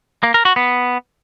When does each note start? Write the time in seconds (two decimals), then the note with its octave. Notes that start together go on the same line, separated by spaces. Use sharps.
0.23 A#3
0.34 A#4
0.45 F#4
0.56 B3